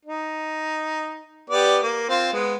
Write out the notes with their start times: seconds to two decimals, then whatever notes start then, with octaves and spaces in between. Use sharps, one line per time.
0.05 D#4
1.50 B3 G4 D5
1.82 A#3
2.09 C4 F4
2.33 G#3 B3